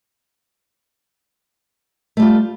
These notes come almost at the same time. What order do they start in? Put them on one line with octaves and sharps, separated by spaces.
A3 G3 F4